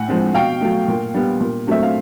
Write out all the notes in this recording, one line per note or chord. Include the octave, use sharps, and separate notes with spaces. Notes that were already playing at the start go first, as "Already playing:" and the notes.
Already playing: A2 F#5 G#5
F3 G#3 C4
B2 F5 G5
F#3 A3
A#2
G3 B3
A#2
F#3 A3 C4 E5
F5